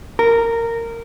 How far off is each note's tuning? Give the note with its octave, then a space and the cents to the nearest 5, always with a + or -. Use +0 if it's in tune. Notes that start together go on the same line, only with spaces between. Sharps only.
A#4 -15